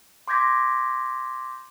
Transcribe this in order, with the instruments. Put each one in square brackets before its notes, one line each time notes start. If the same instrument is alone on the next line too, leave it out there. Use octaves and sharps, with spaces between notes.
[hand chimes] C6 D6 G6 G#6 A#6 B6